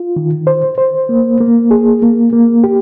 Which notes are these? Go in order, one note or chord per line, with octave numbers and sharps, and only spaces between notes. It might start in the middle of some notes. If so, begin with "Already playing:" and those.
Already playing: F4
D#3
C5
C5
A#3
A#3
G#4
A#3
A#3
G4